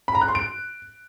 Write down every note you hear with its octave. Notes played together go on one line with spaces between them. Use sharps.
B5
A#5
F#6
C6
D7